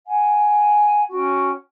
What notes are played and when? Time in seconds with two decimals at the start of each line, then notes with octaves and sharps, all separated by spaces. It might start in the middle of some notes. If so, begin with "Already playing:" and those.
0.06 F#5 G#5
1.10 C#4 F#4 G5